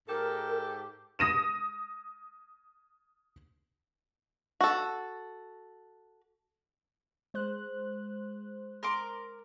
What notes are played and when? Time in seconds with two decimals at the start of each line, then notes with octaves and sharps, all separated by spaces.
0.09 G#2 G4 A4 A#4
1.19 D#6 A#6 D#7 E7
4.60 F#4 A4
7.34 G#3 C5 F#6
8.83 A#4 C6 D6